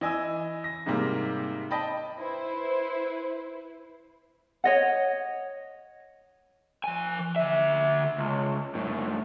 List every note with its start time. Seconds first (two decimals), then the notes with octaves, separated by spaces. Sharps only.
0.01 E3 D#5 G#5 E6
0.64 A#6
0.86 G#2 C3 G3 A#3
1.71 D#5 G5 A5 B5
2.20 E4 B4 C5
4.64 C#5 D#5 F#5
6.84 F3 G#5
7.36 D3 E5
8.18 C#2
8.75 F#2 A2